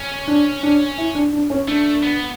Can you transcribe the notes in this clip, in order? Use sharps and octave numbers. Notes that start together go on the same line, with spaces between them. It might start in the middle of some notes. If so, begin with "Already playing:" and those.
Already playing: C#4
D4
D4
E4
D4
D4
C#4
A3 D4
B3